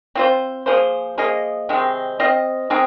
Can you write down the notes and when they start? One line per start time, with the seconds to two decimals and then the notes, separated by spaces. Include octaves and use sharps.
0.15 C4 F4 C5
0.66 F3 A#3 G#4 C5
1.18 F3 A#3 G#4 D#5
1.69 C3 D#3 G#3 C4
2.20 C4 F4 C5 D#5
2.70 G#3 C4 D#4 G#4